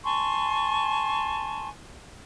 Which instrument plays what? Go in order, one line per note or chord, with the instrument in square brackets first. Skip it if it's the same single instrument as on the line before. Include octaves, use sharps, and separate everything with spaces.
[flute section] G#5 A5 C6 C#6